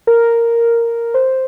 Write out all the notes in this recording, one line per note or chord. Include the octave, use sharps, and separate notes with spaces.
A#4
C5